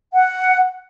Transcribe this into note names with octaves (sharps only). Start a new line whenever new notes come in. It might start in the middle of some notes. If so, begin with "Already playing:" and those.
F#5